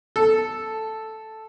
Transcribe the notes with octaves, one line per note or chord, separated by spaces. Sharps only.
A4